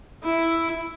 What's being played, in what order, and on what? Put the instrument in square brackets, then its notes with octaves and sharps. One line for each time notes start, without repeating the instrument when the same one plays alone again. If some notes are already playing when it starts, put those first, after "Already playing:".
[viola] E4